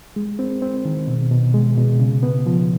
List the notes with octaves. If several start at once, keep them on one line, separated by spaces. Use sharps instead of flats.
G#3
C4
C4
D#3
B2
B2
G#3
B2
C#3
B3
F3